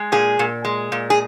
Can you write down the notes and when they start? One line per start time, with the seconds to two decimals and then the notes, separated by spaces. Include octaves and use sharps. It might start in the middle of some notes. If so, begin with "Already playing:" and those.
Already playing: G#3
0.12 A#2 G#4
0.39 A#2
0.65 G#3
0.92 A#2
1.10 G#4